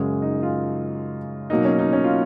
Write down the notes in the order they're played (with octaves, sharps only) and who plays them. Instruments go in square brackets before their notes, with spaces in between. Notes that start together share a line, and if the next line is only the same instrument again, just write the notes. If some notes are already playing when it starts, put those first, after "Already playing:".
Already playing: [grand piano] F#2 C#3 G#3 G#4
D#4
F4
B2 F#3 A#3 D#4
C#4
D#4
C#4
F4